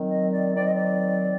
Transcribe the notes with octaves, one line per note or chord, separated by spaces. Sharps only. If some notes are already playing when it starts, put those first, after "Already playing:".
Already playing: D#3 F#3 C4
D#5
D5
D#3 F#3 C4 D5
D#5
D5